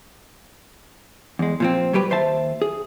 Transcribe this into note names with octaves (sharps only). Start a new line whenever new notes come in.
E2 G#3
A#2 F3 C4
F#3 G3 G4 B4
D#2 C5 E5 A5
G#4